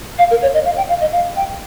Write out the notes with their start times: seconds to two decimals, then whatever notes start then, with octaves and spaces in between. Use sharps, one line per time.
0.19 F5
0.31 A#4
0.42 C#5
0.54 D#5
0.65 F5
0.77 G5
0.89 F5
1.01 D#5
1.12 F5
1.36 G5